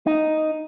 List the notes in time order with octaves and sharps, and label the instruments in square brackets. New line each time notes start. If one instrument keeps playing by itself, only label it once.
[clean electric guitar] D#4